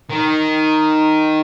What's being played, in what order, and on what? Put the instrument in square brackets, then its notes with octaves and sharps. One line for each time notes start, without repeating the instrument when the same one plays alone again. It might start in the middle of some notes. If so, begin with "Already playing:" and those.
[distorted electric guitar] D#3